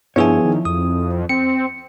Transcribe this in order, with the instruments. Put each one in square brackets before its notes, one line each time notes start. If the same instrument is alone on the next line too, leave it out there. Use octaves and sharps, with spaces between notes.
[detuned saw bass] G2 [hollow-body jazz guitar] F3 E4 C#5 [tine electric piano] B3 G#4 G#5
[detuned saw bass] D#3
[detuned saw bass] F2 [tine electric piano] D#6
[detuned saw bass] C4 [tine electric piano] C#7